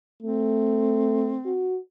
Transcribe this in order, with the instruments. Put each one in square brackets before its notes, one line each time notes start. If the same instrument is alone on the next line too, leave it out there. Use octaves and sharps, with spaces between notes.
[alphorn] A3 [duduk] C4
[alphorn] F#4